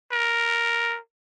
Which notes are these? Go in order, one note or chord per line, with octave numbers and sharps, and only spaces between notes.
A#4